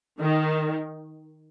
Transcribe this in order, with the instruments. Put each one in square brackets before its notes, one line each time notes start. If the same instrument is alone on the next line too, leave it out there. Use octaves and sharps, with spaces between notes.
[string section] D#3